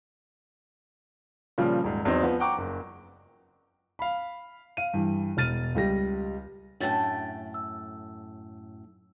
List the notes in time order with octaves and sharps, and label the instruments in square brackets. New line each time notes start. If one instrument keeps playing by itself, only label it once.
[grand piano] A#2 C#3 F3 G3
D#1 G#2
E2 F#3 C4 D#4
F3 B3
F#5 G5 A#5 C#6 D6
F#1
F5 B5
F5 D#7
G2 E3
E1 F6 A6 D#7
C#2 G3 A#6
[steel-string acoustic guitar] F#2 A2 [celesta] D4 F#4 A6 [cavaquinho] E5 G5 A5
[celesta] E6